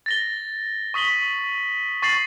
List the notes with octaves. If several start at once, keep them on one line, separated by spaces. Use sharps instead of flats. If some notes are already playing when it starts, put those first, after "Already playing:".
A6 A#6 G7
C#6 D#6 B6 F#7 G7
C#6 A6 C7 F#7